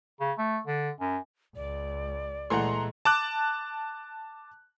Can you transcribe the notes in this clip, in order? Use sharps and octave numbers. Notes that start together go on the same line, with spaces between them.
C#3
A3
D3
F#2
C#2 D5
A#2 E3 G#3 A3 F#5 A#5 C6
A5 D6 F#6